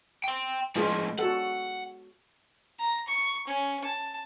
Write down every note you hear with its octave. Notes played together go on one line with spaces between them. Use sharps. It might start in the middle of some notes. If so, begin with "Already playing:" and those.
G5 C6
A2 F3 G#3 F4
F#4 A4 F#5
A#5
C#6
C#4
A5